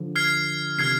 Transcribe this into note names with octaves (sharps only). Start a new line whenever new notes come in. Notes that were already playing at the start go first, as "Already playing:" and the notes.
Already playing: D3 F3
F6 G#6 C7
C3 D#3 F6 G#6 C7